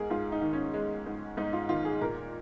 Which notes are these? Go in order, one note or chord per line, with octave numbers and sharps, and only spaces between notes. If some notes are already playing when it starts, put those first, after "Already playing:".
Already playing: G#2 G#4 A#4
G#2 F4
D#4
D#3
C#4
G#3
G#2
G#2 D#4
F4
D#3 F4
G#4
A#2 A#4